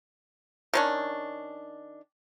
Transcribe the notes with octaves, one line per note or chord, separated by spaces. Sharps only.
D#3 C#4 D4